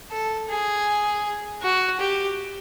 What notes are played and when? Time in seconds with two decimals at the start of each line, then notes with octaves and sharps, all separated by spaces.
0.11 A4
0.49 G#4
1.62 F#4
2.00 G4